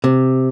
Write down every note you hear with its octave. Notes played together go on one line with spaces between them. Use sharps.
C3